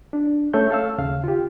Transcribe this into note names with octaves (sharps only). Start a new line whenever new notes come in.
D4
A3 C#4 A4 C#5 E5 G6
A4 F5 E6
D#2 C#3 F5
F4 G4